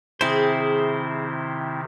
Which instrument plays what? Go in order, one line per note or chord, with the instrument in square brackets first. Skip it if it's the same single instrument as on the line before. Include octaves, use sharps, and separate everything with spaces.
[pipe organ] C3 D#3 [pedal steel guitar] C4 E4 C5 [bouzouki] G#4